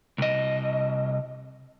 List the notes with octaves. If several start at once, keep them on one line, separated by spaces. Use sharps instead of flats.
C2 D#5